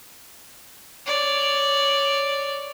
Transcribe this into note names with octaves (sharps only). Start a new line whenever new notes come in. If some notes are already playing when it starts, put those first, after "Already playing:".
C#5 D5